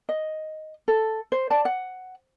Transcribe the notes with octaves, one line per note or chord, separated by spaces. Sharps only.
D#5
A4
C5
D5 A5
F#5